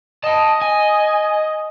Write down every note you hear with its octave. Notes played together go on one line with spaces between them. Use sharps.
D#5 G5 A5
G#5